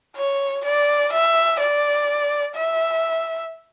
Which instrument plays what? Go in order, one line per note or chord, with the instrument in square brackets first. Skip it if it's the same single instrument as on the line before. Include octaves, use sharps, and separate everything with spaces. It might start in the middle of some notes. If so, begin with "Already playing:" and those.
[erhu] C#5
D5
E5
D5
E5